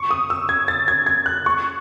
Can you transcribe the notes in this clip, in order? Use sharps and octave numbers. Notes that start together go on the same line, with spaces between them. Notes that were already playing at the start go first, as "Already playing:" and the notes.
Already playing: C#6
D#6
E6
G#6
A6
G#6
G#6
F#6
C#6